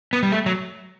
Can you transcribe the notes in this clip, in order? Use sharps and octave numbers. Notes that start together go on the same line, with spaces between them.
B3
G3
A3
F#3